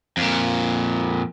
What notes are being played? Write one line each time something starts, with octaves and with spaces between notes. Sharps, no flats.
F2 A#2